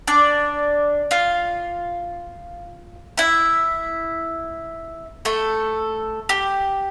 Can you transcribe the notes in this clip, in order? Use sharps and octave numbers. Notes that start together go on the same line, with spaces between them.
D4 D5
F4 F5
E4 E5
A3 A4
G4